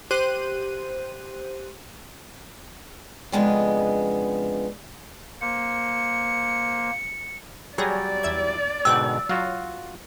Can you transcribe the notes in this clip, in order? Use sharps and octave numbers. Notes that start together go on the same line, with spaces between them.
G4 C5 F#6 D#7
F2 C#3 G#3 B3 D4 D#5
A#3 C5 C#7
F#3 G3 G#4 C#5 D5 A#6
E2 E5 G#6
G#2 B2 D3 G5 D6 E6 F#6
F#3 F4 F#4 F5